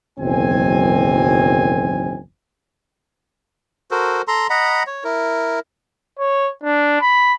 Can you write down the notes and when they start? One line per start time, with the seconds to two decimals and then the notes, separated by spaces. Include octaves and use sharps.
0.19 F#1 B1 E2 D#3 C4 G#5
3.91 F#4 A4 A#4 C5
4.28 A4 A#5 C6
4.50 D#5 F#5 A#5 B5
4.87 C#5
5.04 E4 A#4
6.19 C#5
6.64 D4
7.01 B5